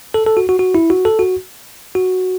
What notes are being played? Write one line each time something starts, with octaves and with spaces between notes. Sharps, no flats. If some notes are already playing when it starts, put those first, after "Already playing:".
A4
A4
F#4
F#4
F#4
E4
F#4
A4
F#4
F#4